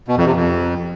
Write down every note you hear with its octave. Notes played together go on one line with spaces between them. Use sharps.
B2
F2
C3
F2